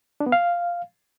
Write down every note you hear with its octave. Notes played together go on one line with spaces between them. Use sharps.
D4
B3
F5